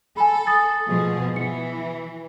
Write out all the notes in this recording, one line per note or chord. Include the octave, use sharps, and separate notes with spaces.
A4 G#5 B5
D#6 A6
B2 F3 G#4
E3 C#7